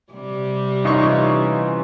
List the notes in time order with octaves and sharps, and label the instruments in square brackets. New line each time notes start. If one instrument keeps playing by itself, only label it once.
[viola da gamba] C3 G3
[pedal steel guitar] E3 C#4 F4 [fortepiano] D#4 C#6